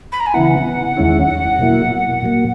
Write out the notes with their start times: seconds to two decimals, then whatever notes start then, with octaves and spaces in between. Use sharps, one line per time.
0.12 B5
0.20 A#5
0.26 G#5
0.34 C#3 E3 B3 E4 F#5
0.97 E2 D#3 G#3 C#4 E4
1.59 B2 F#3 A#3 E4
2.23 A#2 F#3 A#3